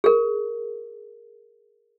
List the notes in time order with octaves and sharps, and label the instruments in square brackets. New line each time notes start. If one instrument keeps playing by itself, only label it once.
[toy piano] G#4 A#4